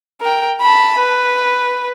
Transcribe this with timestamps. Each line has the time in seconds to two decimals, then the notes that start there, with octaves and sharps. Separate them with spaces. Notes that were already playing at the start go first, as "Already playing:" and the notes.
0.21 A#4 G5
0.61 A5 B5
0.99 B4